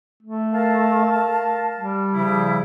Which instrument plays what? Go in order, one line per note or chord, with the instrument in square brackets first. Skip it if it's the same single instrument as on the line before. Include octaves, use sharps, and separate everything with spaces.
[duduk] A3
[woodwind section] A#4 F5 A5
[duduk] G3
[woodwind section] C#3 F3 E4